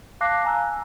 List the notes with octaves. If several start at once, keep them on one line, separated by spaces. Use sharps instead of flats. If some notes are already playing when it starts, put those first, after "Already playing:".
F5 A5 D6 F#6 A#6 C7
G#5 A#5 E6 F#6